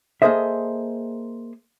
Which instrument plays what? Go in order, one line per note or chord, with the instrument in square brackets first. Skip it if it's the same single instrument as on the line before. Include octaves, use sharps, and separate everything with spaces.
[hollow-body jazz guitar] A#3 G#4 A4 C5 D#5 E5